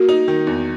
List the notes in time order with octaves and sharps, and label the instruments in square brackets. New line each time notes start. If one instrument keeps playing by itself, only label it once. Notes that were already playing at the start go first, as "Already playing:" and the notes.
Already playing: [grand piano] A#3 [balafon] F#4
[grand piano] D#4
D#3
E2